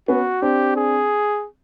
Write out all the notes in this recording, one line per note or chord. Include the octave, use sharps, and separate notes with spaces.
B3 C#4 F#4
C4 D4 G4
G#4